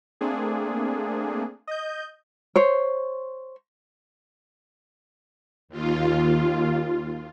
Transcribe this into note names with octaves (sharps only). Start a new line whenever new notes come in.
A3 A#3 C4 D4 G#4
D#5 G6
C5 C#5
D#2 F4